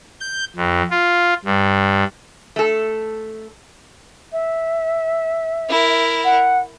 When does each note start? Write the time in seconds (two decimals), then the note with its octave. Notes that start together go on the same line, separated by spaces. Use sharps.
0.21 G6
0.57 F2
0.91 F4
1.45 G2
2.56 A3 A4
4.32 E5
5.70 E4 A#4
6.24 F#5